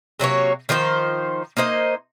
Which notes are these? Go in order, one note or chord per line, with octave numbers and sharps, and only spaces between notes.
C3 F#3 A#3 C#5
D#3 F3 D#4 C5
A#3 D#4 C5 D#5